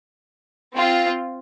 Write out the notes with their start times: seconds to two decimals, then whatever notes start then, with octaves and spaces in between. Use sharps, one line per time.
0.74 C4 F4